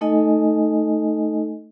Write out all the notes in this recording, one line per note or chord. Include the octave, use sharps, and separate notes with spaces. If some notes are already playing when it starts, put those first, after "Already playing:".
A3 D#4 A4 D#5 G#5